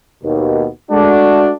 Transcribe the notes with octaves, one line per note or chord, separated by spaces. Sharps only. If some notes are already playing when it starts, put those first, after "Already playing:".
D#2 B2
G#3 A3 D4 F#4